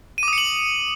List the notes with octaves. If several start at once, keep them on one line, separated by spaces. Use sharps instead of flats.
D6 D#6 C#7 D#7 F#7